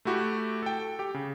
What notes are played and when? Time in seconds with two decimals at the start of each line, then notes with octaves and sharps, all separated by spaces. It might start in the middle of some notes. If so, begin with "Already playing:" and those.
0.05 A3 E4 F#4 G4
0.62 A4 G5
0.99 G4 G5
1.14 C#3